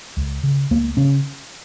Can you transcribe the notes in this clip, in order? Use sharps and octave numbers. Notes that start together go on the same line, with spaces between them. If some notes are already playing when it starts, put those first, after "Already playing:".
C#2
C#3
C#2 A#3
C#3 C#4